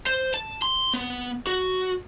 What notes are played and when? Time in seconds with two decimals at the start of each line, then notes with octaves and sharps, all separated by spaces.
0.06 C5
0.34 A5
0.62 C6
0.94 B3
1.47 F#4